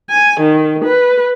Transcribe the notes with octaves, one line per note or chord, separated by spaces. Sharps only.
G#5
D#3
B4